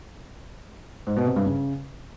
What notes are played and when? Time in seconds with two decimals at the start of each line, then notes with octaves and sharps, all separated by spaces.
1.07 G#2
1.16 B2
1.26 C3
1.36 G2
1.46 C#3